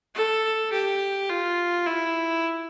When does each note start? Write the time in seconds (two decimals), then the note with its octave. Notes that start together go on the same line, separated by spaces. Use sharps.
0.15 A4
0.73 G4
1.29 F4
1.86 E4